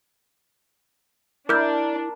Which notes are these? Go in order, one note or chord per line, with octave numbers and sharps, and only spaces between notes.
D4 E4 A#4 D6 F6 G6